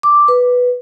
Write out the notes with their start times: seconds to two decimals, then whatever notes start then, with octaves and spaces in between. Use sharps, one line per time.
0.03 D6
0.28 B4